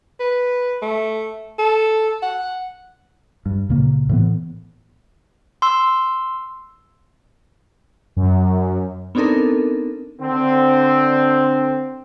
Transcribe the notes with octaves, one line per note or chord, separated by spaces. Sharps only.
B4
A3
A4
F#5
G2
C#2 A#2 C#3 A#3
A2 E3 B3
C6 E6
F#2
B3 C4 D4 D#4 A4 A#4
D3 C4